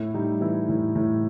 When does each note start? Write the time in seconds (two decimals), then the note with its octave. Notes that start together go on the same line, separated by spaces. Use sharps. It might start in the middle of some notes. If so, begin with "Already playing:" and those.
Already playing: A2 E4
0.14 G3 D#4
0.41 E3 E4
0.68 A2
0.95 A2